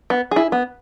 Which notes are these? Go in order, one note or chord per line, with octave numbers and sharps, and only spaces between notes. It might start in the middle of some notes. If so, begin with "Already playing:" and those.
B3
E4 G#4
B3